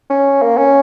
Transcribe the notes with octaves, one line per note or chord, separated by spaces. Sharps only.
C#4
A#3
C#4